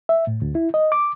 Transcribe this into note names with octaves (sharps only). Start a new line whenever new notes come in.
E5
A2
D2
E4
D#5
D6